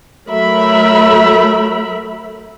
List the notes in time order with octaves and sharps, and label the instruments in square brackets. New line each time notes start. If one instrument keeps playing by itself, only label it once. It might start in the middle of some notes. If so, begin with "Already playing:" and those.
[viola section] F#3 A3 A#4 E5 B5